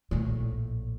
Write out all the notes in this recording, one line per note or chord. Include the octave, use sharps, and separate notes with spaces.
A#1 A2